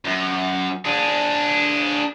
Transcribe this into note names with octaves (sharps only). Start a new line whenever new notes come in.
F#2
D4 G#4